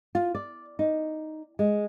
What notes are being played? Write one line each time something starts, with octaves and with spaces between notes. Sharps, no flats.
F4
D5
D#4
G#3